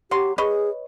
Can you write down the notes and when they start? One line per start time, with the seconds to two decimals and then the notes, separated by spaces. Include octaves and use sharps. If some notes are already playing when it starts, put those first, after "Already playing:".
0.11 F#3 G4 C6
0.38 G#4 B4 C#5 D#5